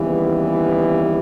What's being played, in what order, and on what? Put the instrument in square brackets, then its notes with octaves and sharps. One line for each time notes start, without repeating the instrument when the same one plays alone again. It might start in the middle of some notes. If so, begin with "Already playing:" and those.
Already playing: [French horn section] D#2 C#3 E3 G3 B3